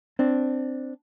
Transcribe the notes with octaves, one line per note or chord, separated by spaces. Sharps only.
C4 D4